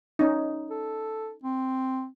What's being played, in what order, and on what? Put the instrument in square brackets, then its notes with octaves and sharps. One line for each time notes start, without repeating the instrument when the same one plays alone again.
[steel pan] C#4 D#4
[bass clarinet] A4
C4